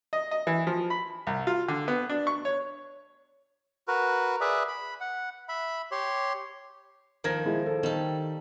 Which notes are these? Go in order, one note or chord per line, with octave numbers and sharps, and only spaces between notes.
D#5
D#5
E3
F3
B5
C2
F4
D3
B3
D4
C#6
C#5
F#4 A#4 B4
G#4 B4 D5 E5
B5
F#5
E5 B5
G4 C#5 C6
D#3 F3 A#4 G#6 A#6
G#3 E4
A4
D#3 G3 A4